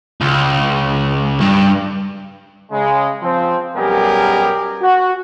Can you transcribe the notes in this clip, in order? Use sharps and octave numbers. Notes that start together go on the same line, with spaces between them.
C#2
G2
C#3 G#3
F3 C4
F#2 B2 G3 G4 G#4 A#4
F#4